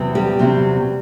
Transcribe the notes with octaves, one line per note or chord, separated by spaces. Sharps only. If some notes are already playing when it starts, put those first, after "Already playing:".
Already playing: E2 C3 F#3 C4
G3 G4
E2 C3 F#3 C4